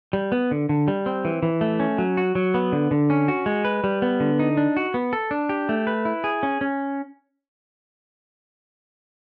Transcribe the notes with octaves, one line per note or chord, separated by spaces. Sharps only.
G3
B3
D3
D3
G3
C4
E3
E3
A3
C#4
F#3
F#4
F#3
B3
D3
D3
C#4
F#4
G#3
B4
G3
B3
D3
D#4
D4
F#4
B3
A4
D4
G4
A3
B4
E4
G#4
C#4
C#4